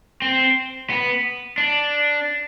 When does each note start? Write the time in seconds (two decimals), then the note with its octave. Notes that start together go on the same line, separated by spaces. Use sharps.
0.22 C4
0.90 B3
1.58 D4